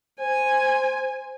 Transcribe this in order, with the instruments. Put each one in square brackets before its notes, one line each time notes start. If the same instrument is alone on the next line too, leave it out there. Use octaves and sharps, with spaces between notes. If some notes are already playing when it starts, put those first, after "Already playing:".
[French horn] C5 [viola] G#5